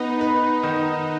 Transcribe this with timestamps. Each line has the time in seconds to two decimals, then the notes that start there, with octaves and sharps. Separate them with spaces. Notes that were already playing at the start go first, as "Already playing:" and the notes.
Already playing: B3 D#4
0.21 B4
0.63 D#3